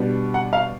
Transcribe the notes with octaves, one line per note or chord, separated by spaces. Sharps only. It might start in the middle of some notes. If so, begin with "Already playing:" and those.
Already playing: B2 G3 B3 D4
F#5
F5